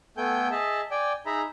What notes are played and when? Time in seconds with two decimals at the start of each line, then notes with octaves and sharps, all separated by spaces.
0.17 A3 B3 A4 G5 G#5 G6
0.51 G#4 D#5 E5 A5
0.91 D5 G5 G#5
1.26 D#4 G#4 E5 A#5 B5